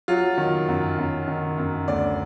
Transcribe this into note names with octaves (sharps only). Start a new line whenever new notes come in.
F#3 F4
D#3
F#2
F#2
D#3
F#2
D2 D5